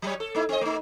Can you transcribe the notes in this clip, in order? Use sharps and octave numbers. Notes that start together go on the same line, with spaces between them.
F#3 G3 C#5
A4
A3 D#4 E4
C4 D#5
A3 D#4